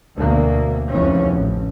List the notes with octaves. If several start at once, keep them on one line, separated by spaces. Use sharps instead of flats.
D2 B2 A#3
F1 C#2 E3 F3 C#4
A1